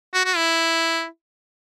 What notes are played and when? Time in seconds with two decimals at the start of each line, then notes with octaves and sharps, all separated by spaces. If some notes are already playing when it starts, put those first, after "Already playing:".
0.14 F#4
0.25 F#4
0.36 E4